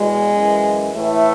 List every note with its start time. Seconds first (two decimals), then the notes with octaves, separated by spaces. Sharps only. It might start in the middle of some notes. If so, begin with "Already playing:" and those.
Already playing: E2 B2 G#3
0.33 F#2 E3
0.94 A2 E3 A3